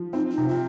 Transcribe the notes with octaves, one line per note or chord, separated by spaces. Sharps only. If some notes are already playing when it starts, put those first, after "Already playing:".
Already playing: F3
C4 D#4
D#4
C3
F4